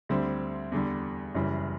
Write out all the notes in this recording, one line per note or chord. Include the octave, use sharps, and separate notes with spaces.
D2 D3 G3 C4
E2 D3 G3
F#1 F#2 E3 G3